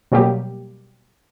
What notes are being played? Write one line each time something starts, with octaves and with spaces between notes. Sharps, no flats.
B2 F#3 G3 A#3 G4